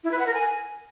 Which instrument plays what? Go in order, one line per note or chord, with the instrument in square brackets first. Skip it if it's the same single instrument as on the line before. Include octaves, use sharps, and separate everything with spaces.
[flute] E4
B4
F#5
A#4
G#5